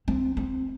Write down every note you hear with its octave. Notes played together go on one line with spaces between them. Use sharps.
C4
C4